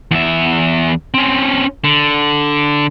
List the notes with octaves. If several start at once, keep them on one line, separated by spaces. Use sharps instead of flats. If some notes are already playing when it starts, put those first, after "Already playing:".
E2 E5
C4 C#4
D3